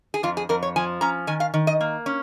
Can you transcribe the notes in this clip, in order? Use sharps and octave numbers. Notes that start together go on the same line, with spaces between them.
G#4
F2 F4
G#4
F2 A#4
C#5
F3 G#5
C#4 A#5
D#3 G#5
F5
D#3
D#5
A#3
C#4